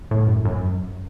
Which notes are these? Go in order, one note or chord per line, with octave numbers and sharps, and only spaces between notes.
A2
F#2
F#2